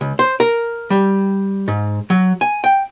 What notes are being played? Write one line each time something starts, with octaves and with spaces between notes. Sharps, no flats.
C#2
C5
A#4
G3
G#2
F#3
G#5
G5